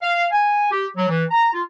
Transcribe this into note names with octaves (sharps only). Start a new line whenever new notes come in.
F5
G#5
G4
F#3
E3
A#5
F4